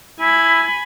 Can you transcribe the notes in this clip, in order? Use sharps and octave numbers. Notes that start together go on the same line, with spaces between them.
E4 G#5 B5